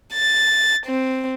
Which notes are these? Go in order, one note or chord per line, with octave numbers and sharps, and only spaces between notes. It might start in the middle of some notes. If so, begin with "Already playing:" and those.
A6
C4